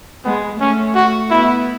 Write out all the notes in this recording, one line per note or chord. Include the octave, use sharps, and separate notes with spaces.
G#3 B3
A3 C#4
F#4
B3 E4